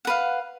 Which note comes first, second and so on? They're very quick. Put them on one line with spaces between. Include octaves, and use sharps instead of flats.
F#5 B4 F5